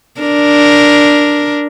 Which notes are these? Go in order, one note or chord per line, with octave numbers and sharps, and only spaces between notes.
D4 A#4